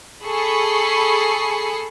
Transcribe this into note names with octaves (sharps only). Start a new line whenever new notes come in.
G#4 A4 B5 C#6 C7